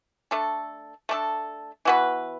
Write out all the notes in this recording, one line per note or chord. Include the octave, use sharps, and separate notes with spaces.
A3 D4 A4
A3 D4 A4
E3 B3 F#4 B4